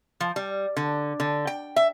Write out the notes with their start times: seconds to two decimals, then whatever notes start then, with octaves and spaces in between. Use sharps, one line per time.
0.20 F3
0.36 G3
0.77 D3
1.20 D3
1.47 G5
1.76 E5